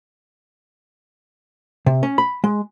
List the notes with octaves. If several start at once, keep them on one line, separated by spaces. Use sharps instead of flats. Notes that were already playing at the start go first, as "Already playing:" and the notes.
C3
C#4
B5
G#3